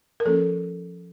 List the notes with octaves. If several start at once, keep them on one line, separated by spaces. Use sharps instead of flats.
A#4
F3 A#3 C#4 A4